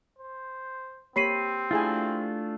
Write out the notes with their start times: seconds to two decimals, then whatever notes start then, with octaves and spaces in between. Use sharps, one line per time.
0.18 C5
1.16 A#3 C4 G4 C#5 B5 C7 D#7
1.71 A3 D4 E4 F4 G#4 G#5